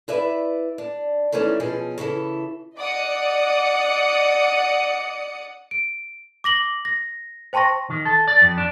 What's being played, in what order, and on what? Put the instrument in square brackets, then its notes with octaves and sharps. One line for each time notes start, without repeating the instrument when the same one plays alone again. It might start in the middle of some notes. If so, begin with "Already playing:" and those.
[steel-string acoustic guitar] E4 B4 D5 E5
D4
D#3 E3 A3 C#4 D4
B2 F3 F#3 C#4 G#4
C#3 E3 E4 A4
[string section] D5 D#5 F#5 D6 D#6 C#7
[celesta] D7
D6 A#6 F#7 G7
A#6
C5 G5 A5 C6 C#6 A#6
[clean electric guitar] D#3
A4
D5
F2
D4